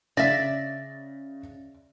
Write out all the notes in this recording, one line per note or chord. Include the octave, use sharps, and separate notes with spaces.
C#3 D5 E5 A#6